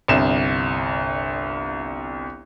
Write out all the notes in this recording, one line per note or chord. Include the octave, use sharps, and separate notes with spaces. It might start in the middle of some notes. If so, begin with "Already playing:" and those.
G1 C2 E7